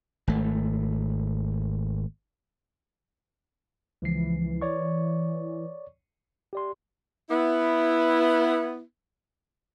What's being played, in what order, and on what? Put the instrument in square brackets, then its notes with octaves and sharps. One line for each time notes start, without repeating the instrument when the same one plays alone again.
[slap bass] G#1 A3
[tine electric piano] C#2 F3 C7 [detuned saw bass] E3
[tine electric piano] C#5 D5 C#6
G4 D5 C6
[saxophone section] B3 E4